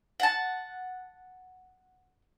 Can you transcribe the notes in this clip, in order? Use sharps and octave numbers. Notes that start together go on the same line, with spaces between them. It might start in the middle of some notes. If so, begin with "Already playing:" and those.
F#5 A5